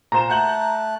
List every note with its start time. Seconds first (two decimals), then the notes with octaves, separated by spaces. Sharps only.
0.12 A#2 C5 A#5 E7
0.30 A3 F#5 A5 F#6 G6 F#7